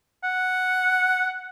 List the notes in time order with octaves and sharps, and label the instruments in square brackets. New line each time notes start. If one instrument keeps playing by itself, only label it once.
[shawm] F#5